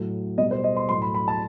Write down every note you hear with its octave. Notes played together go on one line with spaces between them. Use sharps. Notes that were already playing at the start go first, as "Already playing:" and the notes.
Already playing: A2 F#3
B2 G3 D#5
C5
D#5
C6
A2 F#3 C6
B5
B5
A5